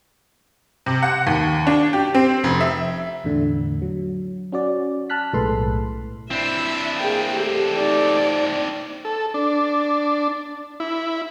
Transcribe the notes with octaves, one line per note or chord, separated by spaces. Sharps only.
C3
F#5
D#2
D4
G4
C4
F1
E5
E2 A2 D3
F#3
C#4 F#4 D5
A5 F6 F#6 B6
B1 A2 G#3 A4 B4 C6
C4 D4 E4 E5
A#3 G#4 G5
A3 G4
D#4 D5
A4
D4
E4